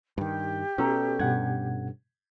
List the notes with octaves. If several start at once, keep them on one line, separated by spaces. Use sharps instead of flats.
G2 D#3 G4
B2 C#4 A4 A#5
G2 B2 F#5 G#6